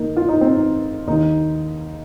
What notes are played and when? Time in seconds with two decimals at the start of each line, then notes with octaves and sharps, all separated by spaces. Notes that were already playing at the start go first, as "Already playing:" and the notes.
Already playing: D#3 A#3 D#4
0.17 F4
0.29 D#4
0.41 C4
0.53 D#4
1.07 D#2 D#3 D#4